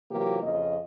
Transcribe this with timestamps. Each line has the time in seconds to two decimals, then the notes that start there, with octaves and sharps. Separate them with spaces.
0.11 C3 E3 F#3 A#3 F4 G4
0.43 F2 C#3 F4 D#5